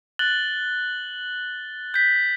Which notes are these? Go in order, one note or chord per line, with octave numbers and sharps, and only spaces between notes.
F#6 A6 F#7 G7
G6 B6